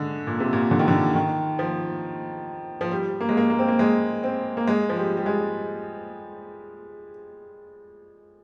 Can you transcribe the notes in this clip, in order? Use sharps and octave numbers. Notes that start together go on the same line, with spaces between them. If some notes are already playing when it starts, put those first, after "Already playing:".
Already playing: D3 G#3
A#2
C3
A#2
D3
D#3
D3
D#3
F3
F3
G3
A#3
G#3
A#3
A#3
C4
A#3
G#3
C4
A#3
G#3
F3
G3
G3
G#3